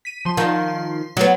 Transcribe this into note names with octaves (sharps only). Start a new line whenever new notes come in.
B6 D#7
F3 C6
D#3 F4
F#3 B3